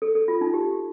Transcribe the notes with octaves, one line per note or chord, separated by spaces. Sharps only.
A4
A4
F4
D#4
G4